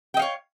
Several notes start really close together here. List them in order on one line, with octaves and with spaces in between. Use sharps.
G5 D#5 F5 C#5